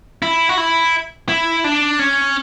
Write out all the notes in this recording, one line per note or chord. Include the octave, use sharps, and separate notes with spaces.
E4
F#4
E4
E4
D4
C#4